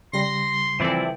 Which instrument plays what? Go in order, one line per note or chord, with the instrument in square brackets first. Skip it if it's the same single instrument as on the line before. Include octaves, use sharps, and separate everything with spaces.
[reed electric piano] C#3 G3 [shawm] C6 [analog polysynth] A#6
[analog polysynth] E3 C4 A4 [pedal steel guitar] F3 E4 D5